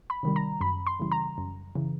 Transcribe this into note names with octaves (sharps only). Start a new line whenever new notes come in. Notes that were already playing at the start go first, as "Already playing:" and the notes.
B5
C3 D#3 G3
A#5
F#2 B5
C6
C#3 E3 G3
A#5
F#2
C#3 E3